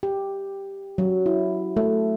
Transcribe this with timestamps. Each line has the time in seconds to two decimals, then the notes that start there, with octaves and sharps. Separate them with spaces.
0.03 G4
0.98 F#3
1.26 E4
1.77 A3